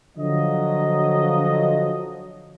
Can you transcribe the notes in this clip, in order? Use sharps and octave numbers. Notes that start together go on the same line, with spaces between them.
D3 F3 F#3 D#5